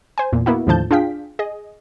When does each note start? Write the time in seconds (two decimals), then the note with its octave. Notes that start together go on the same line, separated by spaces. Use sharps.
0.18 C5 G#5
0.33 E2 A#2
0.46 A#3 B3 E4 F#4
0.67 D#2 A2 D3 F3 A5 G6
0.91 D4 F4 G#4 F5 G5 B6
1.39 G#4 D#5